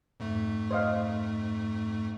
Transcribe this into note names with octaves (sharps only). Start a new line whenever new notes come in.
F2 G#2 A3
C5 D#5 F5